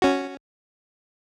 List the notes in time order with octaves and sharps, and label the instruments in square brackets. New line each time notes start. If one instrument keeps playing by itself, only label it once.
[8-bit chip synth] C#4 F#4